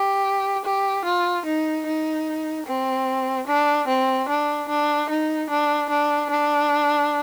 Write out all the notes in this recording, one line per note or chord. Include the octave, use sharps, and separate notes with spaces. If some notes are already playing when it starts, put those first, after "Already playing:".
Already playing: G4
G4
F4
D#4
D#4
C4
D4
C4
D4
D4
D#4
D4
D4
D4